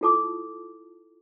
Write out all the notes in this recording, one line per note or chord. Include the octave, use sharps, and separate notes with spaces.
E4 F4 A4 A5 D6 D#6